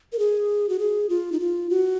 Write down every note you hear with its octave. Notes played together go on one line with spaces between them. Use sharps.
A#4
G#4
F#4
G#4
F4
D#4
F4
F#4